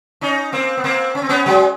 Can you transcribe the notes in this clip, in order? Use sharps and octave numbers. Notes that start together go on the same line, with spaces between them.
C#4 D#4
A#3 C4
B3
A#3 C4
C#4
C4
B3 C#4
F#3 G#3